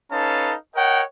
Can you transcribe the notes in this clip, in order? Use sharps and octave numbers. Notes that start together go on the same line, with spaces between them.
C#4 D#4 A4 B4 F5 A5
A#4 C#5 D#5 F#5 G5